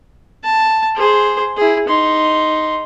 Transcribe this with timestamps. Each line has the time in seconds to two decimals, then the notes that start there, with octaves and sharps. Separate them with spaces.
0.44 A5
0.96 G#4 C5
1.57 E4 G#4
1.88 D#4 C6